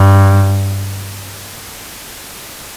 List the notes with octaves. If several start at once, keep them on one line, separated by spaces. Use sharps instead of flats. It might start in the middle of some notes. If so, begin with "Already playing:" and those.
Already playing: G2